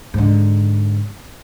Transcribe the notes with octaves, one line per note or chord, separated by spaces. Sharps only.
G#2 D3